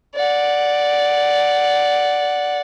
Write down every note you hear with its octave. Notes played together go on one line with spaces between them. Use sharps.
D5 F#5